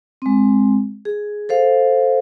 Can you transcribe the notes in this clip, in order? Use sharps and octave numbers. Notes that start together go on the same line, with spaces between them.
G#3 C4
G#4
A4 C5 F5